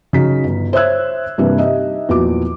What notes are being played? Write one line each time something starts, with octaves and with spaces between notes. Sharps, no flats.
C#3 F#3 D#4 B6
G1
C5 C#5 E5 E6 F#6 G#6
G2 C3 E3 A#3 D4 E4
D#4 G4 D#5 E5
E2 A#2 F3 F#3 F#4 D6